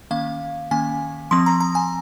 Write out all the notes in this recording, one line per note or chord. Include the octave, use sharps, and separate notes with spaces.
D#3 A#3 C#4 F5
D#3 A#3 C#4 G#5
F3 C4 C6
A#5
A#5
G#5